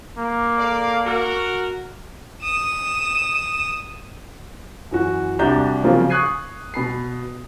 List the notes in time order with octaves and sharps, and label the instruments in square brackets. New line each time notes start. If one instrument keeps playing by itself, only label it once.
[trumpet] A#3
[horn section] A4 D5 F5
F#4 A#4
[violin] D#6 E7
[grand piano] F#2 E3 F#4
C2 D4 F#4 G4 A#5 G6
C#3 F3 F#3 A#3 C4
C#6 D#6 F#6 G#6 C7 D#7
B2 B5 C7